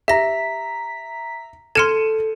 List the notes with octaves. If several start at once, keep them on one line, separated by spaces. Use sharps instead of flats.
G4 E5 A#5 A#6 B6
A4 C6 F6 G#6 C#7 D#7 E7